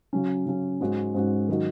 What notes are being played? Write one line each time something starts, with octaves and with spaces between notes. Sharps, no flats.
C#3 F#3 C#4
C#3 F#3 C#4
G#2 G#3 C#4 F#4
G#2 G#3 C#4 F#4
D#3 F#3 D#4 F#4